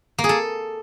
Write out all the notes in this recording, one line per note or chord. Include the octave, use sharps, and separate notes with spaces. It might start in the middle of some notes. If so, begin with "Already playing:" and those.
A#3
G#4
A4